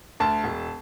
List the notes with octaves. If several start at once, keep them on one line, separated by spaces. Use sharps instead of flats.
D2 A5
E1